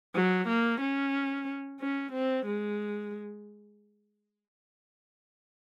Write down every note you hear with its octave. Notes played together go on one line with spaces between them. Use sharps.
F#3
A#3
C#4
C#4
C4
G#3